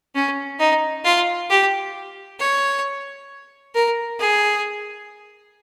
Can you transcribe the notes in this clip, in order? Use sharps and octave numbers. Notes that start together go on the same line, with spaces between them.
C#4
D#4
F4
G4
C#5
A#4
G#4